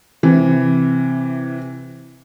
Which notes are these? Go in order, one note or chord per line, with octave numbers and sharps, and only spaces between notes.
C3 E3